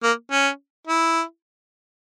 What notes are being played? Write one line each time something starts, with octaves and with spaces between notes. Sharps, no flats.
A#3
C#4
E4